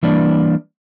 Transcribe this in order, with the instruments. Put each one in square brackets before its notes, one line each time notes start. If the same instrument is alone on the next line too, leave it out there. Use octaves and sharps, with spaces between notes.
[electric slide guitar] E3 G3 A#3 D4 B4 D5